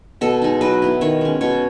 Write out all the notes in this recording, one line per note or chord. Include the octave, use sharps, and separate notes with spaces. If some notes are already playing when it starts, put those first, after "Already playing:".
B2 A4
G#3 D#4
F#3 B4
B3 E4
D#3 C#5
G#3 C#4
B2 C#5